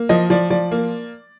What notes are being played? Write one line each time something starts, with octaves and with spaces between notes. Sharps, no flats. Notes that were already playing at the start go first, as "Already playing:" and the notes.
Already playing: A#3
F3 D#5
F3 D5
F3 D5
A#3